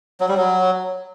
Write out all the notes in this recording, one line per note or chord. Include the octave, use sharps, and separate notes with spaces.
F#3
G3
F#3